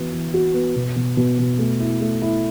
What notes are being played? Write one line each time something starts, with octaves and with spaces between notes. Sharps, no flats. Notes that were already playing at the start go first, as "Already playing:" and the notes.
Already playing: E3 B3 F#4
E3
F#4
B3
B2
B2
B2
B2
A3
E4
A3
E4